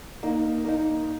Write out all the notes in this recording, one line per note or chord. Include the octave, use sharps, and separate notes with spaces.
A#3 D#4
A#3 D#4